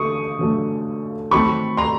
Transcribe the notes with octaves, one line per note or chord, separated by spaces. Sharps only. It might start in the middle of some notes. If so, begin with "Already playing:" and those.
Already playing: D3 F#3 A3 C#6 D#6
D3 F#3 A3
D#3 F#3 A3 C4 B5 C#6
A#5 C6